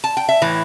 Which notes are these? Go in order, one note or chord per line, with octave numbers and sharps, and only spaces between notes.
A5
G5
E5
A2 E3